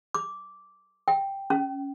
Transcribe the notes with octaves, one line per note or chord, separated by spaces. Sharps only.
D6
G5
C#4